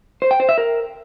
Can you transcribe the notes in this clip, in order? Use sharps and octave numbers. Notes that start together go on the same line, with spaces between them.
C5
G5
C5
E5
A#4